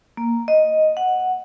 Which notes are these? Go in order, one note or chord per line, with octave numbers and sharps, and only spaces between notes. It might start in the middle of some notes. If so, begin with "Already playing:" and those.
A#3
D#5
F#5